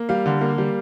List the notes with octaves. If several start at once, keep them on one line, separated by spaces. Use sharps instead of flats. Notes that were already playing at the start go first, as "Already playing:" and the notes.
Already playing: A#3
G3 F5
D3
A#3
G3